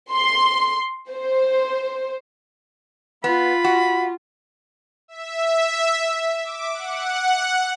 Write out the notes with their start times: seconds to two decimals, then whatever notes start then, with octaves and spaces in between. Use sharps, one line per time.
0.11 C6
1.10 C5
3.24 B3 F4 B5
3.64 F#4
5.08 E5
6.44 D6
6.74 F#5